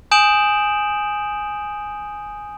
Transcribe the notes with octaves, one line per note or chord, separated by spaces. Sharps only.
G#5 D#6 G6 D7 E7 F#7